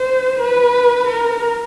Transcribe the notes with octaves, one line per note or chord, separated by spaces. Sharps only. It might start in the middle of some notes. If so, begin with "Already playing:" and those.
Already playing: C5
B4
A#4